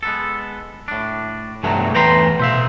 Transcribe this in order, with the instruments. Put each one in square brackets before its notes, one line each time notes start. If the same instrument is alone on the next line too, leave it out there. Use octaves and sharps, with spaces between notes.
[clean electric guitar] G#3 B3 A4
A2 D4
[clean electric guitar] E2 C3 F#3 [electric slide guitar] G2 A3 A5
[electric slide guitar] E2 A3 B4 [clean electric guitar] G5 A#5 C6
[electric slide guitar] B2 F5 [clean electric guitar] C5 E5